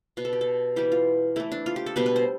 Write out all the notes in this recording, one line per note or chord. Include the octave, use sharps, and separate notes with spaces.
B2 B3 B4
A4
G4
A4
E3 G3 B3 G4
F4
E3 A3 E4
D4
F4
G4
A4
B2 G3 B3 B4
B4
C5